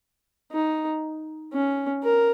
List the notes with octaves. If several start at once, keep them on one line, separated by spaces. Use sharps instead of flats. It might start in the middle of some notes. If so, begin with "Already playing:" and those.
D#4
C#4
A#4